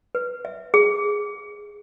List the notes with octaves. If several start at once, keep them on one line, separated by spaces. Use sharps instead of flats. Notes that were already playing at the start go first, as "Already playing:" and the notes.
B4
E5
G#4